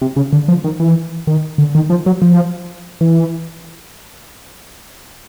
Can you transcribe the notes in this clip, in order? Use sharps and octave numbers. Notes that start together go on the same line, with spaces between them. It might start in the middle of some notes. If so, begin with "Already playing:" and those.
C3
C#3
D3
F3
D#3
E3
D#3
D3
D#3
F3
F#3
F3
E3